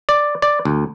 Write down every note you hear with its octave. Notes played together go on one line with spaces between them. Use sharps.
D5
D5
D2